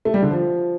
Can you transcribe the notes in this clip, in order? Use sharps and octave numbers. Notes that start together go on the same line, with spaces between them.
A3
G3
D3
F3